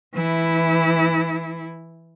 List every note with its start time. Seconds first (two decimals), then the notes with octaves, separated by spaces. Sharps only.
0.14 E3 E4